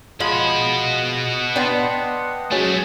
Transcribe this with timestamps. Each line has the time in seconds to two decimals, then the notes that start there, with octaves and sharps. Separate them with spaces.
0.20 B2 F3 G#3 D#5 F#5 B5
1.56 B3 D4 G5 C6
2.51 F#3 G#3 A3 C#4 G#4